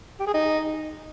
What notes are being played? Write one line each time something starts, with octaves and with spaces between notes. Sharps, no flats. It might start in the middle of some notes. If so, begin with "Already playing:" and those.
G4
G#4
D#4